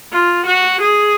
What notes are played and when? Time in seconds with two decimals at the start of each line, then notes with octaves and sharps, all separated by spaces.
0.12 F4
0.46 F#4
0.81 G#4